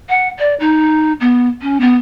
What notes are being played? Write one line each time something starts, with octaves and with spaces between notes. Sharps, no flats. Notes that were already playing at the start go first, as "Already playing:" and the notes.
F#5
D5
D#4
B3
C#4
B3